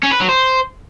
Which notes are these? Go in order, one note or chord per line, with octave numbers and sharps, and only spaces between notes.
C#4
B4
F#3
C5